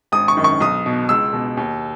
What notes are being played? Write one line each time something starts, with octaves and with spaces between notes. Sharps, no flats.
G#1 D#6
C#6
F#2 D#3
C#6
B1 D#6
B2
C#2 E6
B2
D#2